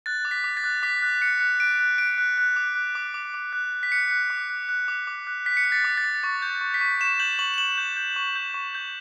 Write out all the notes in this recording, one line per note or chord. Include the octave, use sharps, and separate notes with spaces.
F#6 A6
D6
B6
D6
A6
F#6
D6 B6
F#6
F#6 C#7
F#6
F#6 D7
F#6
F#6 D7
F#6
F#6
D6
F#6
D6
D6
D6
F#6
F#6
B6
F#6 C#7
F#6
D6
F#6
F#6
D6
D6
F#6
F#6 B6
C#7
F#6 B6
A6
D6
A6
D6
C#6 A6
G6
C#6
B6
C#6
C#6 E7
G6 F#7
C#6 F#7
E7
C#6 F#7
G6
G6
C#6
G6
C#6
G6